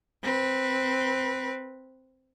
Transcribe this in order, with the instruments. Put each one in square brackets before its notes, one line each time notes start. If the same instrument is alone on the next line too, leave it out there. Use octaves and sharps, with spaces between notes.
[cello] C4 B4